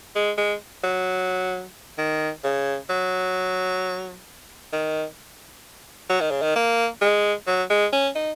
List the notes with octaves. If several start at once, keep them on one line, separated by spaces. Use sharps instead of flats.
G#3
G#3
F#3
D#3
C#3
F#3
D#3
F#3
D#3
C#3
D#3
A#3
G#3
F#3
G#3
C#4
D#4